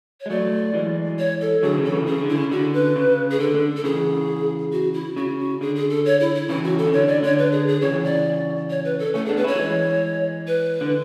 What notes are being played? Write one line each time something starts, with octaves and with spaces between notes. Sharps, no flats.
C#5
G#3
F#3 A3 D5
E3 G#3
C#5
A4
D3 F#3 G#4
C#3 E3
A4
C#3 E3
C#3 G#4
D3
E4
C#3
D3 F#4
B4
C#3
G#4
D3 A4
D3
A4
C#3 E3 G#4
F#4
E4
C#3 F#4
F#4
D3 G#4
G#4
A4
C#5
E4
E4
C#3 E3 E4
F#4
A4
C#3
D3 C#5
D3 D5
D3 C#5
B4
G#4
G#4
C#3 E3 C#5
D5
C#5
B4
A4
A3 C#4 A4
G#4
B3 D4
B4
C#4 E4 C#5
F#3
E3 G#3
B4
D3